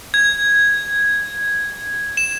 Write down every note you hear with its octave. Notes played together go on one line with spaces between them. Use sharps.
G#6
E7